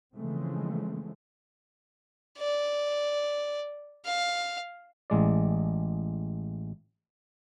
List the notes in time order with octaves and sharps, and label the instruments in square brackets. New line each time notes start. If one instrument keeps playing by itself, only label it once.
[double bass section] C#3 E3 F3 G#3 A3 C4
[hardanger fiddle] D5
F5
[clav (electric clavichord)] A1 G#3 D5